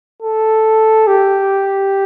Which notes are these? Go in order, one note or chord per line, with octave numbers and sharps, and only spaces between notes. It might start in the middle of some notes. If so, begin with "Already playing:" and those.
A4
G4